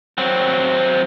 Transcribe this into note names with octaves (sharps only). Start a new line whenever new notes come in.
F#3 C4